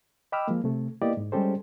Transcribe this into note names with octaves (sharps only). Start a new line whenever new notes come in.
D#5 G5 B5 D6 E6 F6
F3 G#3 A#3
C3 A3
A#3 B3 E4 G4 D5 D#5
G#2
G3 G#3 C#4 G4 A4 C5